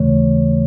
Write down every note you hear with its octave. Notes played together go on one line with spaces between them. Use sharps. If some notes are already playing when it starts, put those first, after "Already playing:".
Already playing: D#2 C#3 E3 A3 C#5